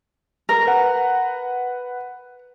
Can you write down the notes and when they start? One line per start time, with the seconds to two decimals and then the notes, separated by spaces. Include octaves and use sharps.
0.49 A#4
0.67 B4 F#5